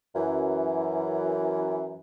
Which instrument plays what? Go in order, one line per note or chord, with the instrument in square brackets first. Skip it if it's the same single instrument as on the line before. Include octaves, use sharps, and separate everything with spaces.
[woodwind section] F#2 E3